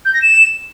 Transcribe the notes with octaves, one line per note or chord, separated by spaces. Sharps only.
G6
A#6
E7